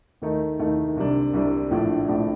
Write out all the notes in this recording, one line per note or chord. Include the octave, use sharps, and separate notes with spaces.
D#2 D#3 A3 D#4
D#2 D#3 A3 D#4
C2 C3 G3 D4
C2 C3 G3 D4
A#1 A2 F3 A3 D4
A#1 A2 F3 A3 D4